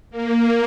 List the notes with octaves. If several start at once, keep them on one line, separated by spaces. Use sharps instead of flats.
A#3